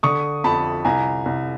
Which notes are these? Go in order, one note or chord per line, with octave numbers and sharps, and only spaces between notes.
D3 C#6 D#6
F2 A5 B5
C2 G#5 A#5
C2